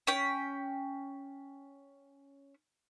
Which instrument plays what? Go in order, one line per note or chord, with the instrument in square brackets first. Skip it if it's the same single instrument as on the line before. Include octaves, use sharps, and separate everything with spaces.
[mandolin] C#4 G5